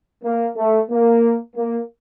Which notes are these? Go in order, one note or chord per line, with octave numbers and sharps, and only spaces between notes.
A#3
A3
A#3
A#3